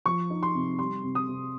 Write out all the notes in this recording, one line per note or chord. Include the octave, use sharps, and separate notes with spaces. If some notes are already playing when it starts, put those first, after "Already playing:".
F3 C#6
D#4
C6
C3
G3 C6
C3
D#6
C3